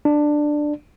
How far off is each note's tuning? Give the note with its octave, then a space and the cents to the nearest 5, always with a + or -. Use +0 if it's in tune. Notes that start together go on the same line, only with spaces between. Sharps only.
D4 +10